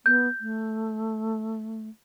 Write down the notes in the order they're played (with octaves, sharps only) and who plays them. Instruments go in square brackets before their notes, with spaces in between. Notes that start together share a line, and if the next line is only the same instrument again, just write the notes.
[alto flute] B3 [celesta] G6
[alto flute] A3